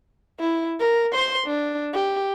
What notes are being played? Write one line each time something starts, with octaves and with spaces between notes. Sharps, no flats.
E4
A#4
C5 C6
D4
G4